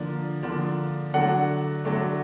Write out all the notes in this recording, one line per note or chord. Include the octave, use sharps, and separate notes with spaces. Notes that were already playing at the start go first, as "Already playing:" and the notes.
Already playing: D3 F3 A#3 D4
D3 F3 A#3 D4
D3 F#3 A3 D4 F#5
D3 F#3 A3 D4